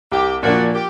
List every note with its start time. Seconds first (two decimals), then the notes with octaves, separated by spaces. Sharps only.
0.12 C2 G4
0.43 A#2 F3 A#3 D4 F#4
0.74 G4